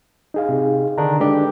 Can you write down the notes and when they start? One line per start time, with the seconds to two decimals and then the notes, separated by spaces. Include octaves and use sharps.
0.34 D#4 G#4 F5
0.49 C3
0.98 D3 D#3 D4 A#5
1.20 G#3 D4 D#4 G4 A4 B4